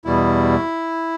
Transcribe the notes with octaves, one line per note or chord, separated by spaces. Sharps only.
E2 B2 G3 E4